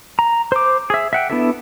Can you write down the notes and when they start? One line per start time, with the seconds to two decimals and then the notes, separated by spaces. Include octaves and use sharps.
0.19 A#5
0.52 C5 D6
0.90 G#4 E5
1.13 E5 F#5 G5
1.30 B3 D4 E4 A4 E5